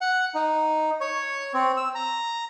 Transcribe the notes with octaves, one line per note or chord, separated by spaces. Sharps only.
F#5
D#4
C#5
C4
E6
A#5